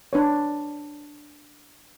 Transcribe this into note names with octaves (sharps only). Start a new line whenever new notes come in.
D4 B4 C#5